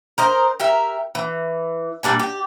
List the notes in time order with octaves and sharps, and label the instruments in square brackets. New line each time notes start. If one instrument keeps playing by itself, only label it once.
[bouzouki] A#4 C5 D#5
G4 A#4 E5
E3
A#2 G3 D4 G#5
G4